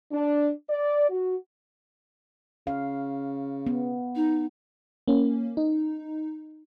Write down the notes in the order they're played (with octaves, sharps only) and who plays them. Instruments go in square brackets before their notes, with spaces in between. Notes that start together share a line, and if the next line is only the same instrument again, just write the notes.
[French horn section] D4
D5
F#4
[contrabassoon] C#3 [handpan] F5
[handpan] B3
[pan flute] D#4
[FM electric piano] A#3 C#4
D#4